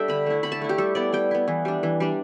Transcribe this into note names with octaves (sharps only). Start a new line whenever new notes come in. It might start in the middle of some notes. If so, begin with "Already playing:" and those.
Already playing: G3 D4 A4 E5 G5
D3 B5
A3 E4
D3 B5
A5
A3 E4
G4
G3 A4
B3 E4 D5
G3 G5
B3 E4
E3
G3 D4
E3
G3 D4